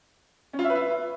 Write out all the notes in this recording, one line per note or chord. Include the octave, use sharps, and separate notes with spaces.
C#4
F4
E5
B4
E5